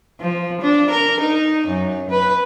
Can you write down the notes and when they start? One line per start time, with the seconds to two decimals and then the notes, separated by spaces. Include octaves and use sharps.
0.21 F3
0.61 D4
0.90 A#4
1.21 D#4
1.68 F#2
2.11 B4